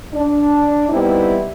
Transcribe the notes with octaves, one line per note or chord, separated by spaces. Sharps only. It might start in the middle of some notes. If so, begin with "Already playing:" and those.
D4
G3 B3 C4 D#4 E4